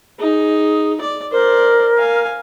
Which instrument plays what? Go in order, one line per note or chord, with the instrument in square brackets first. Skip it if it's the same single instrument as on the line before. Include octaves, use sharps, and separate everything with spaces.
[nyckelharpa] D#4 [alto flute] G#4
[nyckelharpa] D5
[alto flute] A#4 [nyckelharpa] C5 D5
[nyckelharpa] F5 G#5